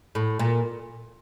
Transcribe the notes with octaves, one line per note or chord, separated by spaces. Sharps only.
A2
A#2